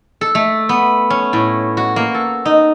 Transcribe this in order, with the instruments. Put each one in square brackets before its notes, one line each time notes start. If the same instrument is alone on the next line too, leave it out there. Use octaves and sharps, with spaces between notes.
[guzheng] A4
A3
B3
C#4
A2
F#4
A#3
A4
D#4